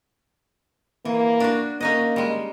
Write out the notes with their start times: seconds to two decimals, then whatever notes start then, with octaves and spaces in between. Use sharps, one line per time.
1.05 E3 A#3
1.40 D4 F#4
1.80 A#3 C#4 D#4 D#5
2.16 G3 G#3